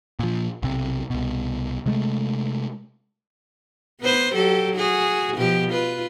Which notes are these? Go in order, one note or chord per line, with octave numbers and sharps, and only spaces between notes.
A#2 F3
B1 C3
C2 B2
C3 G#3 A3
B3 B4 C5
F#3 G4 A4
F#4 G#4
B2 F3 G4
F4 B4